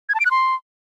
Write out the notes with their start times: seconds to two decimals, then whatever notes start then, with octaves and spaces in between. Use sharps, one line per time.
0.09 G#6
0.15 A5
0.20 D7
0.25 F#6
0.31 C6